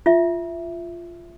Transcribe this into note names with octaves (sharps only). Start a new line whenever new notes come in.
F4 E5